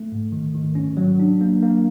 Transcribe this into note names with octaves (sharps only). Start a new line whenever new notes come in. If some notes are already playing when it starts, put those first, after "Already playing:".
Already playing: A3
G#2
D#3
D#3
C#4
F#3
D4
A#3
A#3